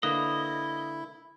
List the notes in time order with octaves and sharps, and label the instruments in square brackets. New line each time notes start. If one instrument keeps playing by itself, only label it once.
[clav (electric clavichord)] D3 A#3 B4 [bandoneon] E4 [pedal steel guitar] D#5